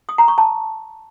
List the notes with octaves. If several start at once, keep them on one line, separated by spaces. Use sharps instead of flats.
D#6
A#5
C#6
A5